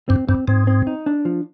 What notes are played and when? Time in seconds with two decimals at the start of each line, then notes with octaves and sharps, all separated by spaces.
0.09 G2 C4
0.28 G2 C4
0.48 G#2 C4
0.67 C4
0.87 D#4
1.06 D4
1.25 F3